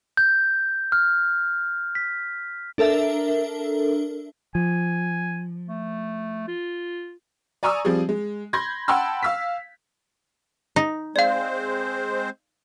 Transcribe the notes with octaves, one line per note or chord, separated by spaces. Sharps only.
G6
F6
B6
D4 A4 A#4 E5
F3 G#5
A3
F4
D5 G#5 A#5 C#6 D#6 E6
F3 G3 C4 G#4
G#3
B5 C6 G6 G#6 A#6
F#5 G5 A5 B5 C6 E6
F5 E6 B6
D#4
G#3 C4 C5 D5 F5